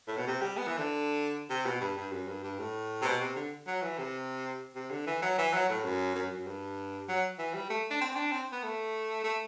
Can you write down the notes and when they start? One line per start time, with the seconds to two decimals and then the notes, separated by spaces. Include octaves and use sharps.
0.08 A2
0.18 B2
0.27 C3
0.42 G3
0.57 B3
0.67 E3
0.78 D3
1.50 C3
1.66 B2
1.81 G2
1.97 G2
2.12 F#2
2.28 G2
2.43 G2
2.59 A2
3.02 C3
3.05 B2
3.21 C3
3.36 D3
3.67 F#3
3.82 E3
3.98 C3
4.76 C3
4.91 D3
5.07 E3
5.22 F#3
5.38 E3
5.53 F#3
5.69 A2
5.84 F#2
6.15 F#2
6.31 F#2
6.47 G2
7.08 F#3
7.38 E3
7.54 G3
7.70 A3
7.90 D4
8.01 C4
8.12 C4
8.16 D4
8.32 C4
8.52 B3
8.63 A3
9.24 A3